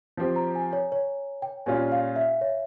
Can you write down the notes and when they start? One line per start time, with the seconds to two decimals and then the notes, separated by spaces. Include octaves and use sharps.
0.17 F3 C4 G4
0.36 A#5
0.55 G#5
0.73 C#5
0.92 C#5
1.42 G5
1.66 A#2 G3 C#4 F4 G#5
1.92 F5
2.16 E5
2.41 C#5